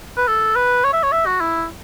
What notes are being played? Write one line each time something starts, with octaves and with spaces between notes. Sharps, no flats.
B4
A4
B4
C#5
E5
C#5
E5
F#4
E4